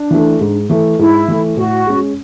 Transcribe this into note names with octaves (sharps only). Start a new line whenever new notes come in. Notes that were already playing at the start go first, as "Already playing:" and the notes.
Already playing: D4
E3 A3
G#2
E3 A3
G#2 E4
E3 A3
A2 F#4
G#3 C#4